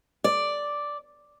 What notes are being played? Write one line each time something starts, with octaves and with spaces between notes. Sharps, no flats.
D5